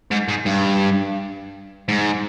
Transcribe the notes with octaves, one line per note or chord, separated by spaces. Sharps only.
G#2
G#2
G2
G#2